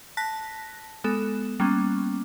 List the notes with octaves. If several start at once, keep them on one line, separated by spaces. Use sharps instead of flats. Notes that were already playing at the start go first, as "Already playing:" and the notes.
A5 F#6 A#6 B6
G#3 B3 A4
G3 A#3 B3 C#4